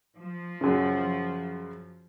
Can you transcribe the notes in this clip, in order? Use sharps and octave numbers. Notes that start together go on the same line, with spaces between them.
F3
F#2 C#3